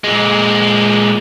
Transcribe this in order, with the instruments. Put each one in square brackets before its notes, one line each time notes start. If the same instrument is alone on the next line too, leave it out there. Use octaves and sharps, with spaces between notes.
[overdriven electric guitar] A#2 G#3